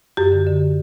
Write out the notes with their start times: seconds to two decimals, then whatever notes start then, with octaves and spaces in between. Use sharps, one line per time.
0.17 F#2 G4
0.32 D3
0.46 D3